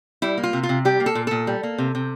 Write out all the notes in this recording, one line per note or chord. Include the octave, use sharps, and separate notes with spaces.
G3 E4
A#3
F4
C3
F4
C3
G3 G4
A#3
A4
A#2
A#2 A4
G3
A#3
C3
C3